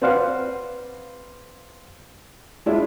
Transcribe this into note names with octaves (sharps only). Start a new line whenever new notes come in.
C4 B4 C5 D5 F5 F#5
G#3 D4 E4 F4